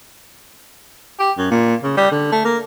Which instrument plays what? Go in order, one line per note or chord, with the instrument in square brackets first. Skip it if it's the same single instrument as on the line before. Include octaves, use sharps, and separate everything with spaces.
[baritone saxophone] G4
F#2
A#2
C#3
G3
D3
A3
A#3